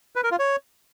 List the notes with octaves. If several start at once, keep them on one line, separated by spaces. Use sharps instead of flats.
B4
A#4
F4
C#5